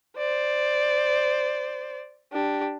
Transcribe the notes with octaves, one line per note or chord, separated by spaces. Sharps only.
C5 D5
D4 G4